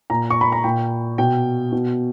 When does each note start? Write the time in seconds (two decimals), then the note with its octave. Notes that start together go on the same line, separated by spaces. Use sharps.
0.10 A#2 A#5
0.30 C#6
0.41 B5
0.52 A#5
0.64 A#2 G5
1.18 B2 G5
1.72 B2